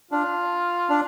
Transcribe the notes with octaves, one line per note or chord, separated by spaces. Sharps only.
D4 F4
D4